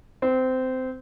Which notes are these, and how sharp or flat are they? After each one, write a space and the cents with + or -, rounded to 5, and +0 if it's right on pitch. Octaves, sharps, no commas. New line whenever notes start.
C4 -20